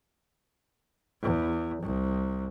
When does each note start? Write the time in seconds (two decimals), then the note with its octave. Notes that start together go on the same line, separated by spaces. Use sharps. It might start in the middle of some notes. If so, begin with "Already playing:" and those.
1.22 E2
1.82 C2